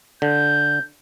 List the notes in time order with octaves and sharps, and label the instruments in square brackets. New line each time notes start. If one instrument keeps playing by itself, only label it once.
[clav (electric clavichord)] D3 [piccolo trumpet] G6